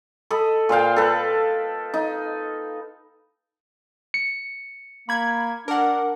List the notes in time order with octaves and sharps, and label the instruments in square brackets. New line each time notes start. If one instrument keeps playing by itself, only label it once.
[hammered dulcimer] A4 D#5 B5
A#2 C5 F5 G5
A4 B4
D#4
[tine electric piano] C#7
[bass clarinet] A#3 [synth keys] B5 G#6
[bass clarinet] D4 [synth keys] A#4 F#5